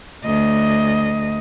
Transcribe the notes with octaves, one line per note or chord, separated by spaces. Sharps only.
D2 D#5